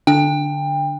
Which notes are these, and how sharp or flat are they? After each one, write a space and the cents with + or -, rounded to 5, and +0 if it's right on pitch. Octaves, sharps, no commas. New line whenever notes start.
D3 +0 D4 +0 G5 +25